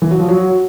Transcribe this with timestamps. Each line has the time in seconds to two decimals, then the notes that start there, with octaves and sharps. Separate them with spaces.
0.02 E3
0.11 F#3
0.20 F3
0.29 F#3